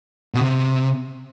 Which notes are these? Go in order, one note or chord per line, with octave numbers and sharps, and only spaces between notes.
B2
C3